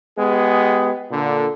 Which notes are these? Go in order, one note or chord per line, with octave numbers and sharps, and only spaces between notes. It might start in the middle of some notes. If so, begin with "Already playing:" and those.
G#3 B3 G4 G#4
A#2 D3